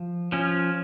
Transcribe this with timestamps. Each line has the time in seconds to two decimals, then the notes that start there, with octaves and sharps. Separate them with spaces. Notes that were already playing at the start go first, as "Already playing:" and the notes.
Already playing: F3
0.32 F3 C#4